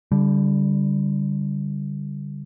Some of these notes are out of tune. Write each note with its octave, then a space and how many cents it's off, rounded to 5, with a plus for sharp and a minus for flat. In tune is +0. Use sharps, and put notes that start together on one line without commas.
D3 -30 G3 +0